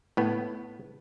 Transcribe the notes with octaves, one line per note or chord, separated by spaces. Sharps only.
A2 B3